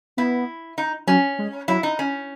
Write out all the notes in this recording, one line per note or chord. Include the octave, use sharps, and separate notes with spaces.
B3 E4
D#4
F#3 C#4
G#3
F#3 E4
D#4
C#4